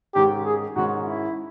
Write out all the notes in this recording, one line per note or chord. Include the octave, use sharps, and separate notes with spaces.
G#2 D#3 G#3 C#4 G4
G#4
G#2 D#3 G#3 C#4 F#4
E4